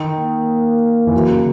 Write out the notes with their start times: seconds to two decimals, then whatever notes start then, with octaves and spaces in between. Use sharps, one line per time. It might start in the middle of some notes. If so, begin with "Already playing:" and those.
Already playing: D#3
0.16 A#3
1.07 E3
1.14 F#3
1.30 C#3